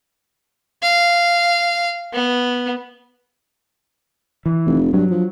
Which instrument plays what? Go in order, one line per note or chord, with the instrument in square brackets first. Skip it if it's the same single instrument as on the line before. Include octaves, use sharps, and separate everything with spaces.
[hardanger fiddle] F5
B3
[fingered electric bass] E3
[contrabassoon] F1
[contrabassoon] G2 [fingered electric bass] F#3
[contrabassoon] F3